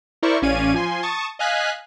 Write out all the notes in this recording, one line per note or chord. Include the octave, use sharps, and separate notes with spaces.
E4 A#4 C5 D5 C#6
A1 C#4 D5 F5 G#6 D#7
F3 G#5 C6
A5 C#6 D#6
D#5 F5 G#5 F#6 B6